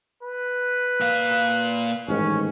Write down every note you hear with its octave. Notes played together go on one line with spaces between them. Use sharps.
B4
A#2 F5
A1 G#2 D#3 C#4